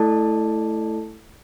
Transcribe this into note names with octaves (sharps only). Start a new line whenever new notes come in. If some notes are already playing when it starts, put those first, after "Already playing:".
Already playing: A3 E4 A4 D5 A5